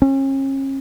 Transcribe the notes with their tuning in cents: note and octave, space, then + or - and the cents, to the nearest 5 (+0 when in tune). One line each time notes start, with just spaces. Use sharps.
C#4 -40